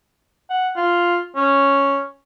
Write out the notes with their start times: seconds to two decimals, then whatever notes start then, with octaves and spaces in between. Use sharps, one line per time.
0.50 F#5
0.77 F4
1.36 C#4